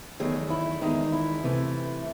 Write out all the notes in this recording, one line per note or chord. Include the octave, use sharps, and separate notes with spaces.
E2 D#3 F#3 A3 G#4
E4
E2 D#3 G#3 D#4
E4
C3 E3 A3